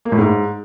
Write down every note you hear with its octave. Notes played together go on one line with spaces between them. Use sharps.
A#3
A2
G#2